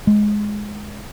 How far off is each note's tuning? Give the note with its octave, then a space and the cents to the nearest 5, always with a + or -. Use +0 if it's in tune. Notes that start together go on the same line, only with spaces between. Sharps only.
G#3 +5